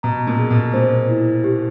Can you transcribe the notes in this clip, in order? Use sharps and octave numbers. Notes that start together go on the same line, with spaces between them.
B2 A#5
A#2
G#4
B2
A#2 C5
E4
G4